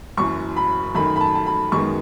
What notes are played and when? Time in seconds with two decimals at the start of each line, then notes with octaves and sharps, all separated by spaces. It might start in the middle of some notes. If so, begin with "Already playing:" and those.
0.17 F#1 F#2 E3 C#6
0.56 B5
0.95 F#2 D#3 A3 B5
1.16 B5
1.20 A5
1.35 A5
1.46 B5
1.72 F#2 D#3 G#3 B3 C#6